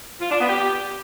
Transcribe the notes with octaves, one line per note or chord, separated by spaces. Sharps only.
F4
D4
B3
G4